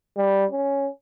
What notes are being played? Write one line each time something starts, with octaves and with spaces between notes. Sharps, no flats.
G3
C#4